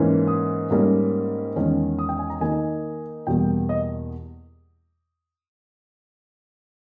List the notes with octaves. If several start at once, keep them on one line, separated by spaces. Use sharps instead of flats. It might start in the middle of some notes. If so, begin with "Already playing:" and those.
Already playing: G#2 E3 A#3 C#4
D#6
G#2 G3 A#3 C#4
E2 D#3 G#3 C#4
D#6
G5
G#5
A#5
D#3 A#3 D#4 G#5
E2 B2 G3 A#3 G5
D#5